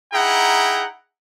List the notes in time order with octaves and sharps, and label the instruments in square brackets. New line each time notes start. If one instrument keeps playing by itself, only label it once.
[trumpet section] D#4 E4 G#4 F#5 G5 A#5